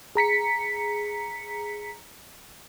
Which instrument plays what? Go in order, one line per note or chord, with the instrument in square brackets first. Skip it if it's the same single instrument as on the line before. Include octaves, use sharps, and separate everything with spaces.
[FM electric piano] G#4 A#5 B6 C#7